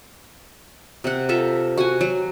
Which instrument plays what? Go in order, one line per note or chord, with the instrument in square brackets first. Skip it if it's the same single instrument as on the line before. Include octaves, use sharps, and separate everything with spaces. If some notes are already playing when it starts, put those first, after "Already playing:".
[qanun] C3 F#5
F4 A4 E5 A#5
F#4 F#5 G#5
F#3